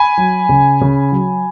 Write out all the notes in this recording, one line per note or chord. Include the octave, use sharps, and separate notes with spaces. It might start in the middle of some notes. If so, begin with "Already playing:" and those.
Already playing: G#5 B5
F#3
C#3
C#3
F#3